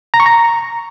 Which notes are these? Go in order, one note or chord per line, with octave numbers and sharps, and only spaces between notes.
A#5
C#6
A#5